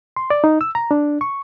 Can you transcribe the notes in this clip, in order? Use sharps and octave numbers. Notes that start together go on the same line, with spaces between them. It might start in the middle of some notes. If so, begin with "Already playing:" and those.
C6
D5
D#4
E6
A#5
D4
C#6